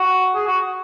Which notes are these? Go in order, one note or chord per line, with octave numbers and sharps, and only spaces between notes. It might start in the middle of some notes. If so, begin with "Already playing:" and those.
Already playing: F#4
G#4
F#4